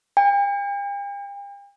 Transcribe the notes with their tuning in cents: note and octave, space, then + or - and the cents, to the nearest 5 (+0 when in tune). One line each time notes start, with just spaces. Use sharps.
G5 +45